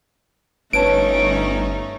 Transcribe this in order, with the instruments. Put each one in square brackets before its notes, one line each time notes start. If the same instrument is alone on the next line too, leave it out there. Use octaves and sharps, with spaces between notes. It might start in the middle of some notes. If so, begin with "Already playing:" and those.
[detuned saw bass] G1 [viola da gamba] A3 C#4 D#4 [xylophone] B4 C#5 A5 [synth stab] D7